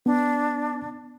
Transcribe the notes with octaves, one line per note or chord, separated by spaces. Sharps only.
B3 D4